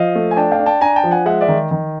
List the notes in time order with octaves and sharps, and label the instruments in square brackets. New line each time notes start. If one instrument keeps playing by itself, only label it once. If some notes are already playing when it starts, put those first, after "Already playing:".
Already playing: [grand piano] F3 D#5 F5
A3
G#5
D4 G5 A5
F5 G5
D4
G5 A5
D4 G#5 A#5
G5 A5
F3
F#5 G#5
G#3 E5 F#5
D5 E5
D#3
D#3